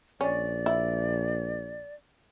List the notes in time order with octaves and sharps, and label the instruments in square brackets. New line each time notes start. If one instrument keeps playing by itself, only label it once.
[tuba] A#1 [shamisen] C#4 [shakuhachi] D5
[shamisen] E4